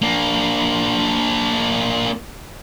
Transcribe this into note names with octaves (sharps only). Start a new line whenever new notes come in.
A#3 D4